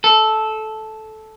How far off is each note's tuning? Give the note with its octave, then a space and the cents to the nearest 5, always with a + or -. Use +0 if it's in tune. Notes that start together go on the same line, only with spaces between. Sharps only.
A4 -10